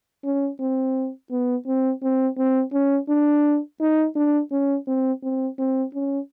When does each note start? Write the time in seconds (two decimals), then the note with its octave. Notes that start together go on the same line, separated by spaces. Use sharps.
0.24 C#4
0.60 C4
1.31 B3
1.66 C4
2.03 C4
2.38 C4
2.73 C#4
3.09 D4
3.81 D#4
4.15 D4
4.52 C#4
4.87 C4
5.23 C4
5.59 C4
5.94 C#4